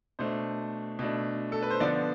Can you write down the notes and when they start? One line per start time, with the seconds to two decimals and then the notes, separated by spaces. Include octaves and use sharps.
0.19 B2 A3 D4 C5
0.99 B2 A3 D4
1.52 A4
1.62 B4
1.70 C5
1.80 D3 F3 B3 D4 D5